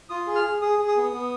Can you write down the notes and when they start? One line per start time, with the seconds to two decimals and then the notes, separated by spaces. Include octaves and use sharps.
0.09 F4 D#6
0.27 G#4
0.36 F6
0.44 G#4
0.61 G#4 D#6
0.79 G#4
0.88 D#6
0.96 B3
1.13 B3